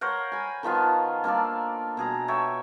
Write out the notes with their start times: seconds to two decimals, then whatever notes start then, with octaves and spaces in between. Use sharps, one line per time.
0.01 A#4 C5 C#5 F#5
0.32 G#5 B5
0.63 D#3 F3 B3 F4
1.24 A#3 D4 A4 D5
1.97 B2 G#4 A#5
2.28 A4 C#5 E5 G5